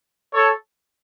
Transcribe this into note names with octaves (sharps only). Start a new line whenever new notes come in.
A4 C#5